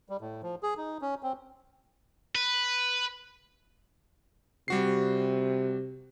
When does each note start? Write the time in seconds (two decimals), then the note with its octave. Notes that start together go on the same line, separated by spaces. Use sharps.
0.09 G3
0.21 A2
0.43 F3
0.63 G#4
0.77 D#4
1.01 C#4
1.23 C4
2.35 B4
4.68 C3 G3 F#4 C7